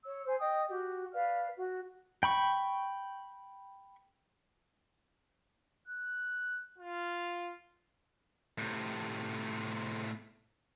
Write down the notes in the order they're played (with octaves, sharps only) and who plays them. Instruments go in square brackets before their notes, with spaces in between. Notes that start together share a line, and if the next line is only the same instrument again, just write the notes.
[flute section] C#5 E6
C5 G#5
D#5 G5 D#6
F#4 G4
B4 D5 F5 F6
F#4
[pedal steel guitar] G5 B5 C#6
[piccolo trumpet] F#6
F4
[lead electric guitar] A2 C3